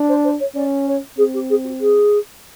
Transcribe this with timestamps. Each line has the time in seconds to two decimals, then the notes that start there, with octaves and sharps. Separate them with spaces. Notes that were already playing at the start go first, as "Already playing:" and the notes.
Already playing: D4
0.08 C5
0.24 C5
0.40 C#5
0.55 C#4 D5
0.87 C#5
1.17 C4 G#4
1.33 G4
1.50 G#4
1.64 F#4
1.80 G#4